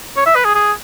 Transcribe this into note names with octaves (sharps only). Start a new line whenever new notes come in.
C#5
E5
B4
G#4
G#4